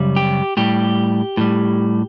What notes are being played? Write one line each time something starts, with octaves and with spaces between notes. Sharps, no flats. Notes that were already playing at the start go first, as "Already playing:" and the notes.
Already playing: F#2 C#3 G3
G4
A2 G3 G4
A2 G3